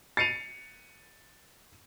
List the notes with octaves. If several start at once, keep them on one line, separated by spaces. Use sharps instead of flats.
A6 C7 C#7 D#7 F7